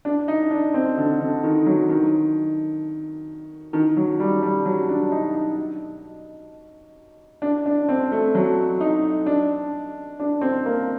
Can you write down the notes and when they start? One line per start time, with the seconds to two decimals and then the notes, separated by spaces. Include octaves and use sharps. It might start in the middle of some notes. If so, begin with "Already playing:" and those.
0.05 D4
0.28 D#4
0.51 D4
0.74 C4
0.97 D3
1.20 D3
1.43 D#3
1.66 F#3
1.89 D#3
3.73 D#3
3.97 F#3
4.20 G3
4.43 G3
4.65 F#3
4.89 D4
5.12 D#4
5.35 D#4
7.42 D4
7.66 D4
7.89 C4
8.12 A3
8.35 F#3
8.80 D#4
9.26 D4
10.20 D4
10.41 C4
10.65 A#3